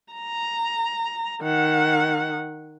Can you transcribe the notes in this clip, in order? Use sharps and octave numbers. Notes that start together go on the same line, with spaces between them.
A#5
D#3 F#5